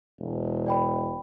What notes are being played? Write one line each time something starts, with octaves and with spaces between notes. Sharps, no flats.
E1
D5 G5 B5